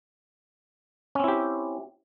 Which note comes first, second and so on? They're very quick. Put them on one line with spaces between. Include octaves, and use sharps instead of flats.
C#4 C4 E4 G4